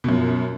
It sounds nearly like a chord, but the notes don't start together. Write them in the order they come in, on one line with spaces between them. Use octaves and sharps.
B2 F#2 F3